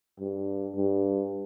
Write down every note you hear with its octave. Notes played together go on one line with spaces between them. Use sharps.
G2
G2